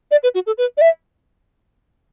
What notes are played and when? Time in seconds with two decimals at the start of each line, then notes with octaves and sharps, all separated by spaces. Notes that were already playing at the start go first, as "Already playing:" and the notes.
0.11 D5
0.23 B4
0.35 F#4
0.46 A4
0.58 B4
0.77 D5
0.81 E5